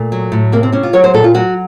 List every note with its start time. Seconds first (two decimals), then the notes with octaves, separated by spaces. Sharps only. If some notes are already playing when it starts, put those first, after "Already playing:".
Already playing: A#2 A3
0.12 F#3
0.32 A2
0.52 C3 A#3
0.63 C4
0.72 C3 C#4
0.83 F4
0.93 F#3 C#5
1.04 C5
1.14 A#2 A4
1.24 F4
1.34 F#3 F#4